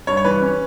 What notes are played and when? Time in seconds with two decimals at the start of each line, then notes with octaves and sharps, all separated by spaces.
0.07 G2 C#5
0.17 C#5
0.25 E3 B4
0.42 C#4